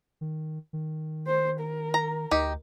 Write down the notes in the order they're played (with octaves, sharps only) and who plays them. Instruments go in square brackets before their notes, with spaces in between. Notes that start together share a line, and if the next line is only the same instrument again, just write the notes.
[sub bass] D#3
D#3
[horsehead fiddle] C5
A#4
[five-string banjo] A#5
[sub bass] D2 [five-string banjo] D#4 G4